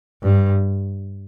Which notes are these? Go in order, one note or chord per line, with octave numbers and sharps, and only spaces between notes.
G2